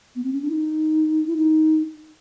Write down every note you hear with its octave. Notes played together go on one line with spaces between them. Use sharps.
B3
C4
C#4
D4
E4
D#4
E4
D#4